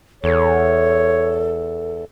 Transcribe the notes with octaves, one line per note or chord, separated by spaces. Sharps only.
E2 A4 C#5